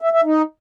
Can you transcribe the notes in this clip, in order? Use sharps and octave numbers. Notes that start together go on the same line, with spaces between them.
E5
E5
D#4